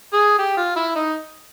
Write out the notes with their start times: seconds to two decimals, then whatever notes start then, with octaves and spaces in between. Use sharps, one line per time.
0.13 G#4
0.39 G4
0.57 F4
0.76 E4
0.96 D#4